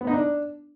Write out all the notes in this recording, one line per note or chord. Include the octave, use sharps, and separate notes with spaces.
B3
D#4
D4